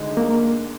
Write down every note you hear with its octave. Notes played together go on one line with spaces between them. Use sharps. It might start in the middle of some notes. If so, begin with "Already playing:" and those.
Already playing: D2 D3 G#3 D#4
A#3